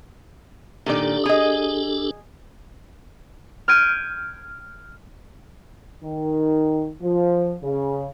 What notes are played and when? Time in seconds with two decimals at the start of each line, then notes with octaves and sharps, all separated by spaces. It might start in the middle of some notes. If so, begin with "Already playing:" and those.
0.86 A#2 D#3 D4 G4 A4 D5
1.25 G#4 D#5
3.68 F6 G6 G#6 D7 D#7
6.03 D#3
7.01 F3
7.63 C#3